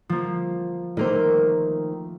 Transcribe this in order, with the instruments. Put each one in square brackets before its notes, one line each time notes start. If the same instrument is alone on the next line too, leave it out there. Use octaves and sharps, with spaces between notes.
[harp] F3 A#3
[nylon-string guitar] D#3 A#4 C5 [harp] A3 A#3